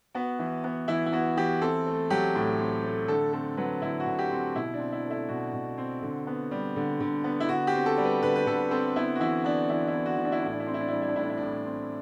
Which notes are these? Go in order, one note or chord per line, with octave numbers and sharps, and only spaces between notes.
B3 F#4
E3
B3
E3 E4
E4
B3 F#4
E3 G4
C4 A4
A3
F#3 G4
A2
C4
A3
D3 A4
C4 A4
F#3 B4
D3 E4
F#4
D3
G4
C4
B2 E4
D4
C4
E4
A3
E4
B2 F#4
B2
C4
D3
B3
G3
D3
D3
B3
E4
D3 F#4
G4
C4
A4
G3
B4
D3 B4
B4
D3 A4
C4 A4
B3 E4
F#4
E3 E4
B3 D4
E3 E4
E4
B3
F#4
E3
D4
E4
D4
A2 E4
D4
E4
C4 D4
E4
D4
E4
G3 D4
E4
D4
A2 E4
D4
E4
A2 D4
C4